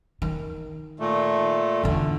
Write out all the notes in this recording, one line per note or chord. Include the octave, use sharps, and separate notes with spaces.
D#3
A#2 A3
E2 D3